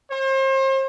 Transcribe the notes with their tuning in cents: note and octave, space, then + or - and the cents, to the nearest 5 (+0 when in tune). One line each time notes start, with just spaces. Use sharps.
C5 +35